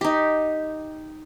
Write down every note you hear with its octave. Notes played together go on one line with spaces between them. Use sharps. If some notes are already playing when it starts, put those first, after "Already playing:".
D#4 G4